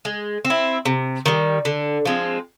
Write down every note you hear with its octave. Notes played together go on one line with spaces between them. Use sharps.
G#3
C4
E4
C3
D#3 G3
D3
F3 G#3 C4